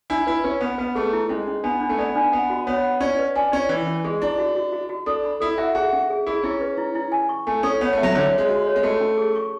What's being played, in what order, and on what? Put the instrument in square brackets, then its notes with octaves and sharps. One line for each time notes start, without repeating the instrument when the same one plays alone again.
[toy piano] D4 [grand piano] E4
[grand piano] E4 [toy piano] B4
[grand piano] C#4 [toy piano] B4
[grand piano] B3 [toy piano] B4
[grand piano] B3 [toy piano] B4
[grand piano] A3 [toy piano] G#4
[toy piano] E4
[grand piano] G#3 [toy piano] C#4
[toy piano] C#4
[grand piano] B3 [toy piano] D4
[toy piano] D4
[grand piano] A3
[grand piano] B3 [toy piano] D5
[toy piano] D4
[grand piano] B3 [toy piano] F#5
[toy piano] F#4
[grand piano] B3 [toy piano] C#5
[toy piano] F#5
[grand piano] C#4 [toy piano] D5
[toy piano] B4
[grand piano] D4 [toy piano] G#5
[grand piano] C#4 [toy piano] D5
[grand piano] E3 [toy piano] C#4
[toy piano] C#4
[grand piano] G#3 [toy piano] G#4
[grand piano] D4 [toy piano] E4
[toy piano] F#4
F#4
F#4
F#4
[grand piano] D4 [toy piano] A4
[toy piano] B5
[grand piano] E4 [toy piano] A4
[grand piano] F#4 [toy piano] E5
[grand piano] F#4 [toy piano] G#4
[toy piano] C#4
G#4
[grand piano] E4 [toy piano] G#4
[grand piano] C#4 [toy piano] E4
[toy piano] B4
E4
E4
G#5
C#6
[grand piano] A3 [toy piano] G#5
[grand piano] C#4 [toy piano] A4
[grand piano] B3 [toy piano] C#5
[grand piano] A3
[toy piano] E5
[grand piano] F#3
[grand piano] D3 [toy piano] C#5
[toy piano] C#5
[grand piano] G#3
[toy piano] F#4
C#5
[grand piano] G#3
[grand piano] A3 [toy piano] F#4
[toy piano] C#4
G#4
C#6